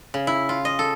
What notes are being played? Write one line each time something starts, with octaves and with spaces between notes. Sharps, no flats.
C#3
E4
F4
D#5
A4